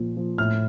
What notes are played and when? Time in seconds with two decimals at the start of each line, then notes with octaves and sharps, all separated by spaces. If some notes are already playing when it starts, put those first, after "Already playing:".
Already playing: A#2 F3
0.17 F3
0.38 A2 F6